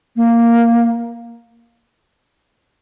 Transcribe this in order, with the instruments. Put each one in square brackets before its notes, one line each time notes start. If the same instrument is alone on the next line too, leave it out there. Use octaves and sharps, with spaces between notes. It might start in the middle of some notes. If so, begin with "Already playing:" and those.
[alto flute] A#3